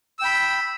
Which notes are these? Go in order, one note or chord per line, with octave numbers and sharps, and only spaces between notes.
G5 B5 E6